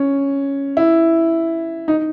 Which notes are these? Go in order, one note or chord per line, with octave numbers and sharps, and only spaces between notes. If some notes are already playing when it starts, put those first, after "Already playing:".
Already playing: C#4
E4
D#4